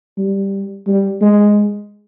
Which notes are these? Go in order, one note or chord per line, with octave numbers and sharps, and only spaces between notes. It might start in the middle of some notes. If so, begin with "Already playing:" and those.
G3
G3
G#3